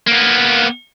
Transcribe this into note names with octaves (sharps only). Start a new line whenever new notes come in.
A#3 B3